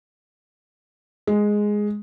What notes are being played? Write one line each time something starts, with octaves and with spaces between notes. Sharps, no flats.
G#3